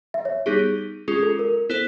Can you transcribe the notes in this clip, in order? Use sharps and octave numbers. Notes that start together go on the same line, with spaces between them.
E5
C#5
G3 B3 D#4 G4 G#4
G#3 C#4 F4 G#4
A4
A#4
B3 E4 A4 C5